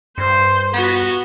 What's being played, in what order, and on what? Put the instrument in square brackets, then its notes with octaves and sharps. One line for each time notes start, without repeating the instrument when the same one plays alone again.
[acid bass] G2 [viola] C5
[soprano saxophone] B3 [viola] F#4